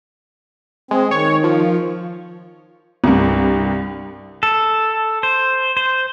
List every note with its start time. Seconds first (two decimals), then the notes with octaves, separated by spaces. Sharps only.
0.91 G#3 C4
1.11 D#3 C#5
1.44 F3
3.04 C2 G2
4.43 A4
5.23 C5
5.77 C5